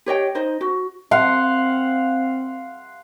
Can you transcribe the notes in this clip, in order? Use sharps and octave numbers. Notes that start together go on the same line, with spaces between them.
G4 C#5 D#5 G5
D#4 C5 D#5
F#4
C4 F5 F#5 C6